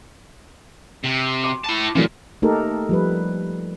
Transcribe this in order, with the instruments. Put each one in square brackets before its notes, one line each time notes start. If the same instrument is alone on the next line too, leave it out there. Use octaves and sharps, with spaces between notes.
[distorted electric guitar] C3
[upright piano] C6 D6
[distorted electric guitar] E4 A5
[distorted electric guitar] A#2 [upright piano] E3 F#3 A3
[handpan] A3 A#3 D#4 G4 A4 A#4
F3 G3 B4